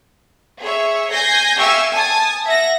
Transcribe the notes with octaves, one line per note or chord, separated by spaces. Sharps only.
G#4 C#5 E5
G#5 G6 A#6 C7
G4 E5 F5 G#5 C#6 E6
G#5 A5 D#6
E5 F#5 A#6